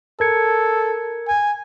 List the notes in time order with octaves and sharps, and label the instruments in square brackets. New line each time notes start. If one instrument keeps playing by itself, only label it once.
[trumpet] A4 [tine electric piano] A#4 G#6 C#7
[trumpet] G#5